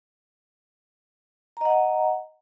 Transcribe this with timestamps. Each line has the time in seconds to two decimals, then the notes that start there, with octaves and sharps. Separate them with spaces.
1.57 A#5
1.61 D#5
1.65 F#5
1.70 G#5